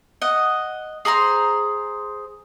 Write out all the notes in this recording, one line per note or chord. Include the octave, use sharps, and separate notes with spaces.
D#5 F#5
G#4 C5 A#5 C6